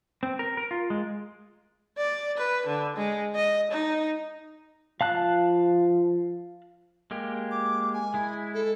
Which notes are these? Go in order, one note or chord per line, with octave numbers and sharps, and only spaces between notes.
C4
A#4
A#4
F4
G#3
D5
B4
D3
G#3
D#5
D#4
F3 F5 A5 F#6
G#3 A#3 G4
D6
G#5
G#3 E4
A4